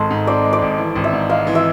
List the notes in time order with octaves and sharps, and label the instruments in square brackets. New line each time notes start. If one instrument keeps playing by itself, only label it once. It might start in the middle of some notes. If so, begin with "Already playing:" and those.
Already playing: [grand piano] G#1 G#3 [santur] A4 C5
[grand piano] G#2
[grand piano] C4 [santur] D5
[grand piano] G#3
[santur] D5
[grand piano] G#1
E3
G#1
[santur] E5
[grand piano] G#2
[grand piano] G#3 [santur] F5
[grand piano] E3
[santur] E5